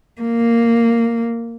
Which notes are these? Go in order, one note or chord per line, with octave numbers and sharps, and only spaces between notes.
A#3